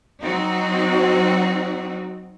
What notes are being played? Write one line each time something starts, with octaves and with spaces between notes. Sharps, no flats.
F#3 C4 D#4 F#4